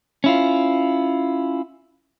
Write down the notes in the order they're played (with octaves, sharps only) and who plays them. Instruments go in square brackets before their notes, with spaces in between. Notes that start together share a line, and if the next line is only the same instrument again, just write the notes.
[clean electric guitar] C#4 E4 F4